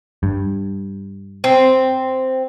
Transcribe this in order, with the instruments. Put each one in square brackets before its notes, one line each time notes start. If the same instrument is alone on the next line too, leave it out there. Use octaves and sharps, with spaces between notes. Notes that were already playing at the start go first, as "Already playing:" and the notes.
[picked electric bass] G2
[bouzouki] C4